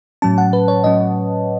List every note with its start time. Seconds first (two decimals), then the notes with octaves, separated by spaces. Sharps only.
0.22 A2 F#3 C#4 A5
0.38 F#5
0.53 B4
0.68 C#5
0.84 A2 F#3 C#4 D#5